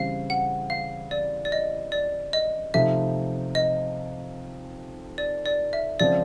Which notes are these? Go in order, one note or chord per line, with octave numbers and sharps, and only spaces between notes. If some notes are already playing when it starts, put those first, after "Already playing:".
Already playing: C#3 E3 G3 C4 F5
F#5
F5
D5
D5
D#5
D5
D#5
C3 F3 A3 C4 D#4 E5
D#5
D5
D5
E5
C#3 F3 G#3 C4 D5